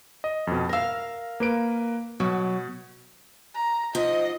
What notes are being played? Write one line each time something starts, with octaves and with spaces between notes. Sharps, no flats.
D#5
F2 B2
A#4 F5 E6 A#6
A#3 B4 D7
B2 F#3
A#5
G#2 F3 D#5